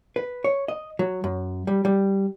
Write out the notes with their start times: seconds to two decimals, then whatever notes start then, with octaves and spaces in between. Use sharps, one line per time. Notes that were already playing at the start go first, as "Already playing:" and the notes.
0.16 B4
0.44 C#5
0.68 D#5
0.99 F#3
1.24 F#2
1.67 G3
1.85 G3